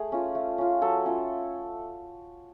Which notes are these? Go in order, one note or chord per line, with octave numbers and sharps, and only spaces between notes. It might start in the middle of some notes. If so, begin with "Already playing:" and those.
Already playing: A3 G#4
C#4 F4
A3
C#4 F4
F#3 A4
C#4 F4